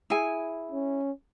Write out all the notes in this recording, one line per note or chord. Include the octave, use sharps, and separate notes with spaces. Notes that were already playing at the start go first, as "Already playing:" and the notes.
E4 G#4 G#5
C#4